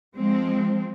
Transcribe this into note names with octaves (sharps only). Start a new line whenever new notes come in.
F3 G#3 C4